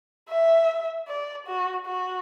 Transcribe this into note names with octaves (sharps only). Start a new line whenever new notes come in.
E5
D5
F#4
F#4